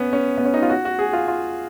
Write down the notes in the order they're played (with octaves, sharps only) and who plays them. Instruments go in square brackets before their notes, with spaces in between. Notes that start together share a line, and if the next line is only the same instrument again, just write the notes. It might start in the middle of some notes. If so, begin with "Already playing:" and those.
Already playing: [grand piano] B3 C#4
C#4
B3
C#4
D#4
F4
F#4
F#4
G#4
F4
F4